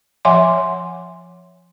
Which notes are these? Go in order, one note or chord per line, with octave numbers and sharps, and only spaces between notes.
F3 C#5 E5 F#5 G#5 C6